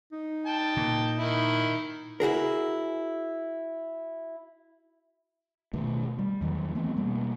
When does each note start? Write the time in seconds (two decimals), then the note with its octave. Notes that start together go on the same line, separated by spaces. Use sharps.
0.12 D#4
0.46 G5 A5
0.77 A#2
1.19 D#3 E4
2.20 E4 F#4 G#4 A#4
5.73 B2 D#3 A3
6.19 G3
6.41 E2 D#3 E3 F#3
6.75 E3 A3 B3 C4
6.97 B2 G3 A#3